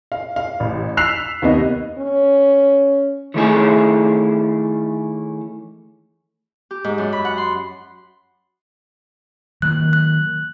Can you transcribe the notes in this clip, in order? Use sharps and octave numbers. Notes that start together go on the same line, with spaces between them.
F5
F5
A1
E6 F#6 B6 C7 F7
D#2 C3 B3 D#5
C#4
D#3 E3 A3 C#4 E4 G#4
G4
G#2
F#2
B5
F#5
C6
D#3 F#3 A#3 F#6
F#6